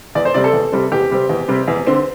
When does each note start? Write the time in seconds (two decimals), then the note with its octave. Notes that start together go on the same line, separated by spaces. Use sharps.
0.15 E2 D5
0.25 C5
0.34 C3 G3 C4 D5
0.44 A4
0.53 E2
0.72 C3 G3 C4
0.92 E2 G4
1.10 C3 G3 C4
1.29 E2
1.48 C3 G3 C4
1.68 E2
1.87 D3 C4